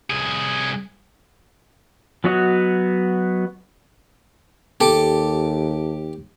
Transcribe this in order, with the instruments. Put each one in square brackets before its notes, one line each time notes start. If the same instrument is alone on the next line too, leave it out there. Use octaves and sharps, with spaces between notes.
[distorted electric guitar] C2 G#4
[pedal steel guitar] F#3 B3 F#4 C#5 D#5
[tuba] D#2 [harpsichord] G4 D6 [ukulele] A4